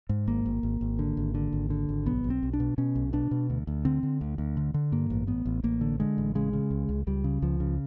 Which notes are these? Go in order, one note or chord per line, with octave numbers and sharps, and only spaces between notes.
G#2
G#1 A#3
G#1
G#1
G#1
D3
G#1
D3
G#1
D3
G#1
B1 B3
B1
C4
B1
D4
B2
B2 C#4
B1
B2 D4
B2
D2
D2
D3 C4
D3
D2
D2
D3
D3
G2 A#3
A1
A1 B3
A1
A1 A#3
D3
D3 G#3
A1
C#3 G#3
C#3
C#2
C#2
C#2 G3
C#3
C#2 F3
C#3